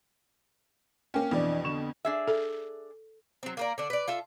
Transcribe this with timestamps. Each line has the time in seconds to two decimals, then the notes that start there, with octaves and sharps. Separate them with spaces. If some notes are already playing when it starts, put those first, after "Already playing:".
1.14 A#3 C#4 G5
1.31 F2 B2 E3 D4 D5
1.64 D3 C#6 E7
2.05 D4 G#4 E5
2.28 A4
3.43 F#3 C4
3.57 A#3 A#4 D5
3.78 D3 D4
3.90 B4 D5
4.08 F4 A4 E5